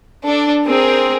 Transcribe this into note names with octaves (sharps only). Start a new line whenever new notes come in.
D4 A4
C4 G#4 A#4